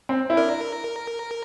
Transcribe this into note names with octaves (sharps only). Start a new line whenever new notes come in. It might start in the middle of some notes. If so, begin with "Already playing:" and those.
C4
E4
D4 A#4